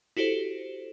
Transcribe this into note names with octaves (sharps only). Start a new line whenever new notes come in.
E4 F#4 G4 A4 C5